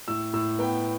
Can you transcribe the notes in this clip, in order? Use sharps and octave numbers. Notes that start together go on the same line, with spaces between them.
A2 E6
A2 E6
B3 G5